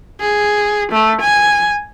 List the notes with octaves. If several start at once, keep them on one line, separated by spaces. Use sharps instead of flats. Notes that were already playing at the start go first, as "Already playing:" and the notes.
G#4
A3
G#5